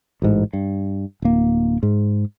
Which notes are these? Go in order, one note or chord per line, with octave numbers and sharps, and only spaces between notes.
A1 G#2
G2
D1 A#3
G#2